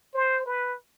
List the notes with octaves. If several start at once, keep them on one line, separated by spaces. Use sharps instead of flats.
C5
B4